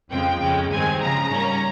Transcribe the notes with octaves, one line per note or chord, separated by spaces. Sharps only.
F2 C#3 F3 G#3 C4 G5
F2 C#3 G#3 C#4
G2 D#3 G#3 C4 G#5
C#3 F3 G#3 A#5
G#2 G3 A#3 C#4